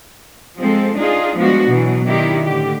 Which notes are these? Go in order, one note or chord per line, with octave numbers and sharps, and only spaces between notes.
F3 G#3 C4 A4
D4 D#4 F4 G#4
F3 G3 G#3 B3 D4 F#4
B2 E3 F#3
D#3 D4 E4 G4
A2 D3 G4